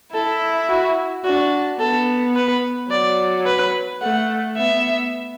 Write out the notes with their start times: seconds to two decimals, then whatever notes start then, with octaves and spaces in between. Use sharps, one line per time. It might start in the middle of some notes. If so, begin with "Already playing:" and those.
0.14 E4 A4
0.70 F#4
1.25 D4 F#4
1.80 B3 A4
2.36 B4
2.91 F#3 D5
3.46 B4
4.02 A3 F#5
4.57 B3 E5